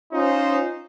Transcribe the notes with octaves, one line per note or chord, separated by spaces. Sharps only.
C#4 D#4 F4 C5